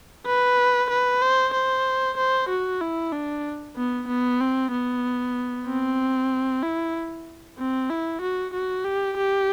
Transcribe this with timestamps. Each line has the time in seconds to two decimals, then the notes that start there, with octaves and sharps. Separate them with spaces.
0.26 B4
0.90 B4
1.21 C5
1.53 C5
2.17 C5
2.49 F#4
2.81 E4
3.12 D4
3.76 B3
4.08 B3
4.40 C4
4.72 B3
5.67 C4
6.63 E4
7.58 C4
7.90 E4
8.22 F#4
8.54 F#4
8.85 G4
9.17 G4